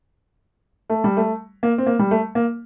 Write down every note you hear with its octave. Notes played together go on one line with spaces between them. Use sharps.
A3
G3
A3
A#3
C4
A#3
G3
A3
A#3